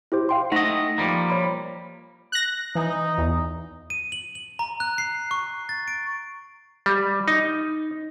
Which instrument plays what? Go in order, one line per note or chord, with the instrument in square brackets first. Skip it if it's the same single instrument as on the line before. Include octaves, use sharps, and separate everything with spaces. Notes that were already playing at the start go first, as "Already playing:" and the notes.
[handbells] E4 G4 C5
F5 G5 C6
[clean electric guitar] A3 D#5 [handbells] D#4 F#5 A#6
[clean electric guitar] F3 G3 A#3
[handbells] C#5 B5
[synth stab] F#6 A#6
[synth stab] E3 [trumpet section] D#4
[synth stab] E2
[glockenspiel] D#7
F#7
F#7
A#5
F#6
C7
C#6
A6
D7
[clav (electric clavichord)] G3
D#4